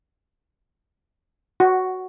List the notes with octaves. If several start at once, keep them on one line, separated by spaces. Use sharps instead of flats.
F#4